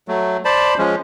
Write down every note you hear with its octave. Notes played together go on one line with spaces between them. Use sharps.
F#3 A3
C5 D5 A5 B5
F3 G#3 C#4